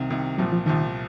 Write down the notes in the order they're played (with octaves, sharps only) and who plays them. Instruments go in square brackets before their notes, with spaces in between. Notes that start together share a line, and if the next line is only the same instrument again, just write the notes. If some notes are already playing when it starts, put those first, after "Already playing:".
Already playing: [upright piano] C2 C3 D#3
C2 C3 D#3
[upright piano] C2 A#2 F3 [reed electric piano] F#3
[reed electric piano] F3
[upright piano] C2 A#2 F3 [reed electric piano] D#3